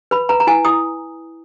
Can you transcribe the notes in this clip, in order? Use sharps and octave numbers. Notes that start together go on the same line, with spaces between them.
B4 B5
B4 A#5
A#5
E4 G#5
E4 D#6